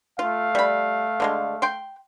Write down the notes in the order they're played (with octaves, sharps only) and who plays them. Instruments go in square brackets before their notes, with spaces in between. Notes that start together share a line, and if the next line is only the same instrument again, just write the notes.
[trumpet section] A3 F5 [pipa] F4
[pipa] G3 B5
D3 F#3 G#3
G5 C6